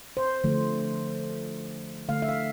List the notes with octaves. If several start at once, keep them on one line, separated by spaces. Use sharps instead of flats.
C5
D3 F3 A3
D3 A3 F5
E5
F5